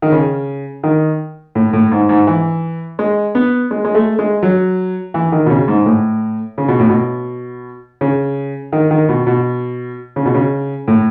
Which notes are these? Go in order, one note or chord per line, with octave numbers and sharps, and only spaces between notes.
D#3
C#3
D#3
A2
A2
G#2
G#2
E3
G#3
B3
G#3
G#3
A3
G#3
F#3
E3
D#3
B2
C#3
G#2
A2
C#3
B2
A2
B2
C#3
D#3
D#3
B2
B2
C#3
B2
C#3
A2